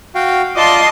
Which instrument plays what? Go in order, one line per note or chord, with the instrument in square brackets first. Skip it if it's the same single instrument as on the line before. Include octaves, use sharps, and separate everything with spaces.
[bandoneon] F#4 F5 G5
[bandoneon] F4 D5 D6 [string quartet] D#5 A5 C6